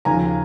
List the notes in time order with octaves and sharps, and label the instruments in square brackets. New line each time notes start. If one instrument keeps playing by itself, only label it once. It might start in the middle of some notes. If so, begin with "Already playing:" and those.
[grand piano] D#2 C#3 F3 G#5 A#5